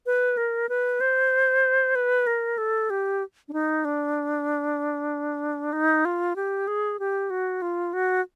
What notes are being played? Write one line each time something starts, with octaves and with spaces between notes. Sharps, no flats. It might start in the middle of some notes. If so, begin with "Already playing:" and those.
B4
A#4
B4
C5
B4
A#4
A4
G4
D4
D#4
D4
D#4
F4
G4
G#4
G4
F#4
F4
F#4